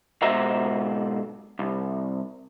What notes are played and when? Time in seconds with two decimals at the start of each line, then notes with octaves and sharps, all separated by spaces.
0.22 G#2 B2 F#4 C5 E5 A#5
1.59 C2